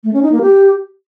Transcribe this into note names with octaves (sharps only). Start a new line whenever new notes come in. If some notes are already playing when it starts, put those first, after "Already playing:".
A3
C#4
D#4
A#3
G4